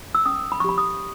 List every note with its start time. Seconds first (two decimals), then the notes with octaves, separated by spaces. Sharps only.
0.15 E6
0.26 C#4 D#6
0.52 B5
0.60 C#6
0.64 G4 B5
0.78 D#6